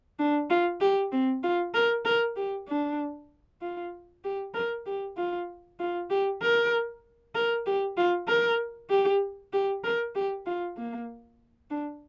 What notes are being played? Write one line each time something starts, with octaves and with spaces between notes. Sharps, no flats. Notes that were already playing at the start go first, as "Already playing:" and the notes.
D4
F4
G4
C4
F4
A#4
A#4
G4
D4
F4
G4
A#4
G4
F4
F4
G4
A#4
A#4
G4
F4
A#4
G4
G4
A#4
G4
F4
A#3
D4